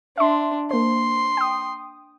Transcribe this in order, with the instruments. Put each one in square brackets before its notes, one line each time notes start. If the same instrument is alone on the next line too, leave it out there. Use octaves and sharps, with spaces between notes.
[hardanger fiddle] D4 [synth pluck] E5 C6
[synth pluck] A#3 C5 [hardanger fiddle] C6
[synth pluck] G5 D#6